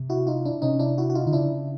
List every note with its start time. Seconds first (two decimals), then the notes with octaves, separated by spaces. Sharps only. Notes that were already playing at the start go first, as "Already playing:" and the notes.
Already playing: C3
0.10 E4 F#4
0.27 D#4 F4
0.45 D4 E4
0.62 C3 C#4 D#4
0.79 D4 E4
0.98 E4 F#4
1.10 F#4
1.15 D#4 F4
1.26 D3 D#4
1.33 C#3 D4 E4